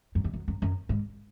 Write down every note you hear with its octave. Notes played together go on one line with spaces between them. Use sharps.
F#2
E2
F#2
F#2
F#2
G#2